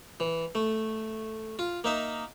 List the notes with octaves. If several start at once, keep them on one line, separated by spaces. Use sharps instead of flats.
E3
A3
F4
A#3 D#4 E5